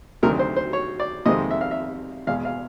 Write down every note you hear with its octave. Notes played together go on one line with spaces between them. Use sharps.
D2 C3 D#3 F#3 A#4
C5
C5
C#5
D5
F2 C3 D#3 G#3 C4 D#5
E5
F5
E5
E2 B2 G#3 F5
F5